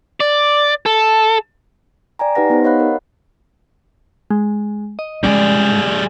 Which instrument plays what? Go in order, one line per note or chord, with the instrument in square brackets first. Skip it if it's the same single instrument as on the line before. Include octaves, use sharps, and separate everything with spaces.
[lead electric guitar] D5
A4
[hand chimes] D5 G5 G#5 A#5
D#4 G4 B4 F#5 A#6
B3 D#4 G4 C5
C#5 D#5 F5 F#5 B5 F#6
A#4
[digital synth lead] G#3
D#5
[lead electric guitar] G3 G#4 [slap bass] G#3 B3 C#4 [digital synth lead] D5